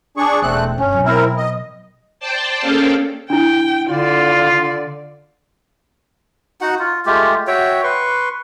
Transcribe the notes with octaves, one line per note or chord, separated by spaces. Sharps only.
D4 G#4 C#6
E1 A3 C4 F#6
G1 C#4
B2 F#3
C4 E4 A#4
D#5
C5 D5 G5 A5
A#3 C#4 G#4 A4 F5 G5
D4 E4 G5
D3 F4 D5
D#4 F#4 F#5
F4
G#3 A3 F4 G4
F#4 C#5 E5 G5
B4 C6 C#6